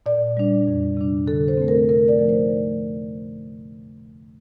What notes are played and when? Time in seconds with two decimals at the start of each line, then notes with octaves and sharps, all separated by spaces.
0.06 A#2 D5
0.37 G3 D4
0.67 F2
0.97 C3 G3 D4
1.27 D3 A4
1.48 C5
1.58 A3 C4
1.68 A#4
1.89 C3 A#4
2.08 D5
2.19 F3 A3 D#4
2.29 C5